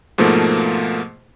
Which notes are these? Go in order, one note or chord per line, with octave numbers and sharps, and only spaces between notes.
G#2 B2 F3 A3 A#3